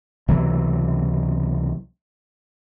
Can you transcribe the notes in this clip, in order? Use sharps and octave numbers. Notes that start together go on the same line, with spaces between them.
C#2 C3 E3 F#3